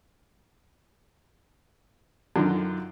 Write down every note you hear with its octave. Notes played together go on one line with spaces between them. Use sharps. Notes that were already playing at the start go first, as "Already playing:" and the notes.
F#2 D3 D#3 F4